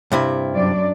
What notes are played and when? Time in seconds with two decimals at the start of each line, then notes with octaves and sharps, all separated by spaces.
0.12 G2 C3 E4
0.53 F#2 D4 D5